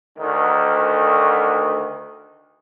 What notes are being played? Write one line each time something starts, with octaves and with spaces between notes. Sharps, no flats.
D2 D#3